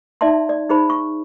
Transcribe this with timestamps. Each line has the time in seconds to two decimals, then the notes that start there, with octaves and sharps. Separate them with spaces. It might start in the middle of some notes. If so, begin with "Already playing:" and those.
0.21 D#4 D5 E5 A5 C6
0.49 D5
0.69 D#4 G#4 C5 B5
0.90 C#6